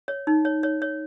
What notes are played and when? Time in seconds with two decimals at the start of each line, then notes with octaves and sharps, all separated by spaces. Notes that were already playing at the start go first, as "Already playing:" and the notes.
0.08 C#5
0.27 D#4
0.45 C#5
0.63 C#5
0.82 C#5